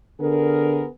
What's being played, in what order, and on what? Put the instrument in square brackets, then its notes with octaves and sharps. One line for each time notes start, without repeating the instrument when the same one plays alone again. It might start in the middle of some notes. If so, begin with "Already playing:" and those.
[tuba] D3 [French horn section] B3 G#4 A#4